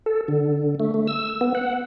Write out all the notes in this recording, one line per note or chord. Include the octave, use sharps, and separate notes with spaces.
A4
D3
A3
A3
E6
B3
F#5